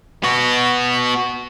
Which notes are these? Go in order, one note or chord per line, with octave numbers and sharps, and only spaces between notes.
B3 F#4